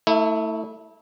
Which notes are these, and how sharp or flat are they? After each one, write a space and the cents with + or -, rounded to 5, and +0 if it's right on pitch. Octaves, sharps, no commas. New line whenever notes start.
A3 +20 E4 -25